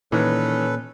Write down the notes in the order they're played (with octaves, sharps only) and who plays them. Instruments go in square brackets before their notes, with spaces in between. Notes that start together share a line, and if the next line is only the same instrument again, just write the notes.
[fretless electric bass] A#2 [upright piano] D#3 E3 [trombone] C#4 [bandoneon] A4 B4